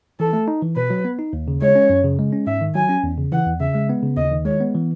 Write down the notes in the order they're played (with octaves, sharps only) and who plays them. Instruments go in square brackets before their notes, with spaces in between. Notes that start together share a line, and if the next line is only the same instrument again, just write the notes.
[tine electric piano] E3 [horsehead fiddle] A4
[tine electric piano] A3
D#4
E3
[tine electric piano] B2 [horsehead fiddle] B4
[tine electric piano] F#3
B3
D#4
D#2
C#3
[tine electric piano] G#3 [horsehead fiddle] C#5
[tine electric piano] C#4
F#2
C#3
G#3
C#4
[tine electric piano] G#2 [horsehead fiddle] E5
[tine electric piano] D#3
[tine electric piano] F#3 [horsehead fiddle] G#5
[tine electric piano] C#4
E2
C#3
[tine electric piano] E3 [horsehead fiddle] F#5
[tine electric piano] E2
[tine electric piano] C#3 [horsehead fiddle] E5
[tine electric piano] G#3
B3
C#3
[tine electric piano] D#2 [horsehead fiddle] D#5
[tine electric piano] D#3
[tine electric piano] G#3 [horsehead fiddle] C#5
[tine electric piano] B3
E3